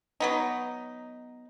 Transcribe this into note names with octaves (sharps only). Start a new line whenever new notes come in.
F#3 B3 D#4